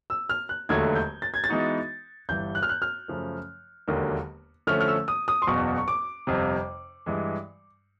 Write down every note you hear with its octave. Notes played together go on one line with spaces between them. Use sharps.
E6
F6
F#6
E1 D#2 D3 F#3 A3 G#6
G6
A6
G#6
A6
E3 G#3 B3 D#4 F#4
G1 G2 E3 G6
F#6
F6
F#6
F6
F#2 C#3 F3 A3
E1 D#2 D3 F#3 A#3
D3 F3 A3 C#4 F6
F6
E6
D#6
D#6
C6
F#1 E2 B2 C#6
C#6
D6
G1 F2 C3
G2 E3 G#3